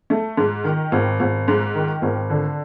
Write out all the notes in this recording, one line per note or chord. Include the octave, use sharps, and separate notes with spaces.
A3
G#2
D#3
G#1
G#1
G#2
D#3
G#1
D3